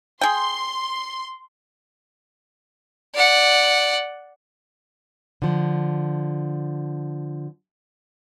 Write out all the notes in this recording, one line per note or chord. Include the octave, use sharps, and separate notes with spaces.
G#4 G5 C6
D5 F#5
D3 F3